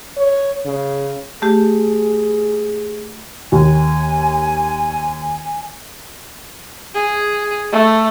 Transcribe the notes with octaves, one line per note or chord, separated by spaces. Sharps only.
C#5
C#3
A3 G4 G#4
D#2 G#5
G#4
A3